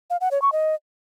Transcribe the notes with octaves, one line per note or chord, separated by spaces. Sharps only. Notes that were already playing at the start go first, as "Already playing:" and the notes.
F5
F#5
C#5
C#6
D#5